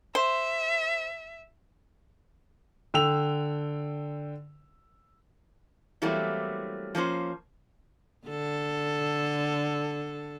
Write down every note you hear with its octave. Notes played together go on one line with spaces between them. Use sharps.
C5 E5
D3 G5 E6 F7
E3 F#3 G3 A3 A#3 C4
F3 A#3 C#4 C5
D3 A4